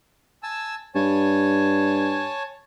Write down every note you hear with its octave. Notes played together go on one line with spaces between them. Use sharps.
G#5 A5 E6
G2 C#5 G#5 A5